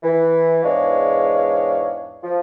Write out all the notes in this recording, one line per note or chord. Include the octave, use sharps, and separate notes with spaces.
E3
E2 G#2 G#3 D4 C#5 F5
F3